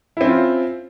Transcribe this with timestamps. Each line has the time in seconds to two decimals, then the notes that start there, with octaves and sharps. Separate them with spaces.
0.17 E4
0.21 C4
0.25 C#4
0.29 F4